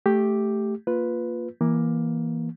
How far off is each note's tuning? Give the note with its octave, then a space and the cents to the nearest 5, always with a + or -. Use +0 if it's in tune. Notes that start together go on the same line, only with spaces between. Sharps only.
A3 -5 G4 +0
A#3 +0 F4 +0 B4 +0
E3 +0 A#3 +15